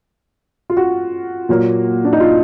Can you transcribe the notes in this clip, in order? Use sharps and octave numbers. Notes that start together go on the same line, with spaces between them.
F4
F#4
A#2 F#3 A#3
D4
D#4
F4